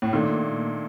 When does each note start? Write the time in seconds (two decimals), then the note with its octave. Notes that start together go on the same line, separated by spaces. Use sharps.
0.02 A2
0.13 A#2 D#3 A3 D4